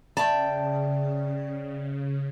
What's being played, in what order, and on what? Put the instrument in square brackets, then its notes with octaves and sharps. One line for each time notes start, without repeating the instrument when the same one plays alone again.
[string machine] C#3 [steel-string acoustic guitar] D5 E5 G5 [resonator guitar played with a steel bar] A5